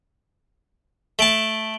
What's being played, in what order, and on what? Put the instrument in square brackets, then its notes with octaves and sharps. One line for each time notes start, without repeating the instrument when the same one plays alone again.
[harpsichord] A3 A5 [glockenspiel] D7 F#7 G7